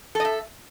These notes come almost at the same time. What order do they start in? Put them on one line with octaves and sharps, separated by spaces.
A4 D#5 E5